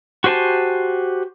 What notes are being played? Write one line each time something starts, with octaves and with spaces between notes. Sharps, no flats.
F#4 G4 C5 G#5 A5